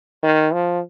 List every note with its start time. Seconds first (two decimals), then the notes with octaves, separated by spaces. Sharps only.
0.23 D#3
0.53 F3